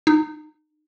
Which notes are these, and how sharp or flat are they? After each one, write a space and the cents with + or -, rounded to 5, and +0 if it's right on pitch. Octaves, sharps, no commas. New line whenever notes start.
D#4 -30